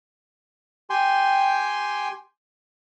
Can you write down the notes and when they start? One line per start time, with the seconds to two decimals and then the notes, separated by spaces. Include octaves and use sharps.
0.90 G4 G5 G#5 C6